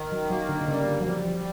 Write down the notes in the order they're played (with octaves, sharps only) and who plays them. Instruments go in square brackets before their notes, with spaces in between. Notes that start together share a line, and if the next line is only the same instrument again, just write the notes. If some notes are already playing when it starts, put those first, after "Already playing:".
Already playing: [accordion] D#3
[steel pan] F#3
[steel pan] F#3 [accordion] A#3
[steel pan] D3
D3
[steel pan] C#3 [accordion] G3
[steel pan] D3
F#3
[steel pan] F3 [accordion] G3
[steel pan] F3